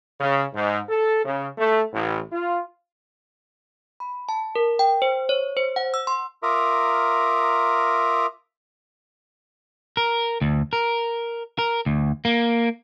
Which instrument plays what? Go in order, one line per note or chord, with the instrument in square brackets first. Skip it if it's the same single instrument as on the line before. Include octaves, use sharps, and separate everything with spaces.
[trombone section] C#3
G#2
A4
C#3
A3
A1
F4
[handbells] B5
A5
A#4
G5
C5
C#5
C5
F#5
E6
C6
[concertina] F4 A#4 E5 A#5 D6 D#6
[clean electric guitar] A#4
D2
A#4
A#4
D2
A#3